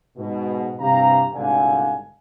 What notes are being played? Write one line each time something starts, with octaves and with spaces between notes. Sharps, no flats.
G#2 B2
G2 C3 E3 G4 F5 A#5
C2 G#2 B2 D3 F5 G#5